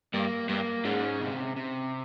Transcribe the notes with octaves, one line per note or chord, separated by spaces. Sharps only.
G2 A#3
G2 A#3
G#2 C#4
C3
C3